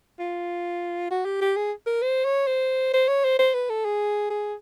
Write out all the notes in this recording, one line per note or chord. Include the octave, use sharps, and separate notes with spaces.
F4
F#4
G4
G4
G#4
A#4
C5
C#5
C5
C5
C#5
C5
C5
B4
A4
G#4
G#4